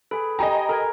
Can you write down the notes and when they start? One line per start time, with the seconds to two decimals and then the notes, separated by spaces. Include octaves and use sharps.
0.11 G#4 A4 B4
0.39 G4 D#5 G5 G#5 A#5
0.69 A4 A#4 G#6